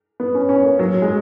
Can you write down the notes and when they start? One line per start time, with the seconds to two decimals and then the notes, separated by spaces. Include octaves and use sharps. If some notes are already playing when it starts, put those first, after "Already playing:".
0.20 B3
0.35 C#4
0.49 C#4
0.64 A#3
0.79 F#3
1.02 G#3